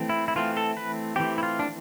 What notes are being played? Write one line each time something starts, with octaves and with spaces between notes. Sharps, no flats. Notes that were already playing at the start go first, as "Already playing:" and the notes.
Already playing: E3 A3 C4
E4
E4
E3 A3 C4 F4
A4
B4
E3 A3 C4 G4
E4
F4
D4